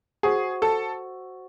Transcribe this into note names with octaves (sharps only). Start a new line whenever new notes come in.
F#4 G#4 C5 F#5 C#6
A4